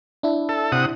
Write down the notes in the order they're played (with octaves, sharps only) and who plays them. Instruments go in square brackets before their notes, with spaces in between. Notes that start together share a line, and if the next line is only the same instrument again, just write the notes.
[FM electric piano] D4 E4
[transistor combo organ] A4
C3 F#5 D#6